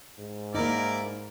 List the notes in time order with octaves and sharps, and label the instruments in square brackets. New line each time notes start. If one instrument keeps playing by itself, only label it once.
[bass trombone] G#2
[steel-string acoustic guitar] A#3 D#4 [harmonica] E4 A#4 D5